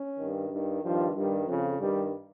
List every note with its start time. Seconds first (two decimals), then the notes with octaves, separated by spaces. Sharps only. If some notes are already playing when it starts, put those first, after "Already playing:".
Already playing: C#4
0.17 G2 D#3
0.50 G2 D#3
0.82 G2 D#3 F3
1.14 G2 D#3 G3
1.47 F2 C#3 F3
1.79 G2 D#3 G3